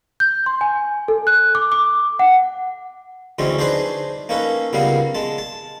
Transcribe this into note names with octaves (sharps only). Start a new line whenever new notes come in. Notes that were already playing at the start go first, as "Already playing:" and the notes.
G6
C6
G#5
A4
F#6
D6
D6
F#5
D2 E3 G#3 C4 C#4
D4 D#4 G#4 B4 C5 D5
A#3 C#4 D#4 A4 B4
C#2 G3 A#3 B3 F5
G#3 A5
A5